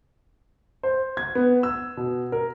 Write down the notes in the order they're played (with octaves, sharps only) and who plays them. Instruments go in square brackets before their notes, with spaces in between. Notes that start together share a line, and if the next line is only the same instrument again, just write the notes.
[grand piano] C5
G#6
B3
E6
B2
A#4